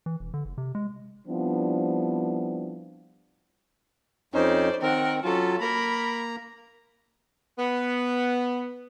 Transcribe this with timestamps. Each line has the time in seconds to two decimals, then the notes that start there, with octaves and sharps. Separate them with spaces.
0.06 E3
0.20 E1
0.34 D3
0.45 F#1
0.58 C3
0.75 G#3
1.28 F3 G3 B3 C4 D4 E4
4.34 F2 C#4 D#4 C5 D5
4.82 D#3 C4 A#4 F#5
5.24 F#3 C#4 F4 A4
5.61 A#3 A#4 A#5 B5
7.59 B3